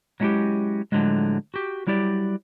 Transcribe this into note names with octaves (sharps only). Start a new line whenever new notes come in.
F#3 G#3 C#4 D#4 E4 G4
A2 D3 F3 F#3 G#3
F#4 G4
F#3 G3 E4 G4 D5